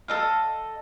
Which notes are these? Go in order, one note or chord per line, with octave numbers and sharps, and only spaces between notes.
A4 D#5 F5